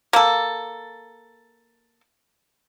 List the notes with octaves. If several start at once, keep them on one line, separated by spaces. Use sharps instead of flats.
A#3 A4